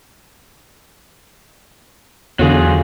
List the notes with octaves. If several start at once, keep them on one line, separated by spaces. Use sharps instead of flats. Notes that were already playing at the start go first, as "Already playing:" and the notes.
E2 D3 F#3 F4 G#4